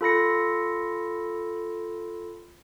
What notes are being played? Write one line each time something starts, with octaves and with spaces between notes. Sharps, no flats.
F4 A4 B5 A#6 C#7